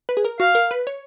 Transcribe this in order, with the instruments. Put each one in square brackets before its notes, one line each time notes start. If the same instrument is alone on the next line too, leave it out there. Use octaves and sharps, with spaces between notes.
[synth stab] B4
G#4
A#4
[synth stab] F#4 [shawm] F5
[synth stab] A#4
B4
C#5